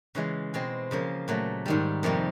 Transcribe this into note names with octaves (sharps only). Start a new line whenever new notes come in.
C#3 E3 G#3
B2 G#3 C4
C#3 F3 A#3
A#2 F#3 A3
G#2 D#3 G3
F2 C3 D#3 G3 A#3